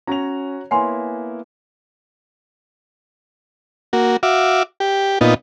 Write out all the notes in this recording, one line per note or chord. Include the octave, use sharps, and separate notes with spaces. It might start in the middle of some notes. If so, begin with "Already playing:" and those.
C#4 F#4 C#5 A#5 F7
A#3 B3 E4 C#5 F#5 G#5 C6
A#3 F#4
F#4 E5 F5 D6
G4
A#2 B3 D#4 F4